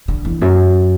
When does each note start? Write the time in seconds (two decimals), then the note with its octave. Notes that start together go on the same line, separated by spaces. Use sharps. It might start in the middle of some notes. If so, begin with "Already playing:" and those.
0.08 D3
0.25 E2
0.41 F#2